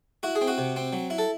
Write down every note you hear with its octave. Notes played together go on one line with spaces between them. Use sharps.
E4 F#4
G#4
C4
F#4
C3
C4
F#3
E4
A4